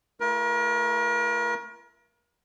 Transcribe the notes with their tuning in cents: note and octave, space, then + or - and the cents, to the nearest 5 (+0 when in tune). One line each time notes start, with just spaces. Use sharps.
A3 +0 F4 -40 A#4 +40